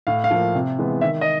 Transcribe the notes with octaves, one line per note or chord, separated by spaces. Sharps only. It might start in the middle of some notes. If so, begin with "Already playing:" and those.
A2 F5
F5
F3 A#3
C3
E3 G#3 B3
D#3 E5
D#5